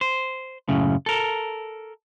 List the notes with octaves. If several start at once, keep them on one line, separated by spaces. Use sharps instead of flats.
C5
F#2 A2 C#3
A4 A#4